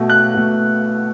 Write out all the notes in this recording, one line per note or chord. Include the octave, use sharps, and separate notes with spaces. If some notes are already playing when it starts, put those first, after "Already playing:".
Already playing: B2 A3
F#6
B2 A3